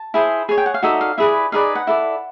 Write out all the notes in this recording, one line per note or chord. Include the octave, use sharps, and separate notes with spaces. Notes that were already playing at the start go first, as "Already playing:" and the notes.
Already playing: A5
E4 G#4 C5
G#4 C#5 G#5
G5
F#5
F5
D#4 F#4 A4 D5 E5
F5
E4 G#4 B4 D5 E5
D#4 G#4 B4 D5 F5
F#5
E4 A4 D5